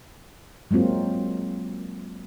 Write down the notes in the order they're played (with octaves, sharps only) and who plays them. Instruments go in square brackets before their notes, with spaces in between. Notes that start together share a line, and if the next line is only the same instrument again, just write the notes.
[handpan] F#3 G#3 A#3 C4 F4